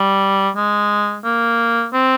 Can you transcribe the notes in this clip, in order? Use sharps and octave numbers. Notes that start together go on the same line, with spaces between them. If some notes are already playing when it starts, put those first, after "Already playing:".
Already playing: G3
G#3
A#3
C4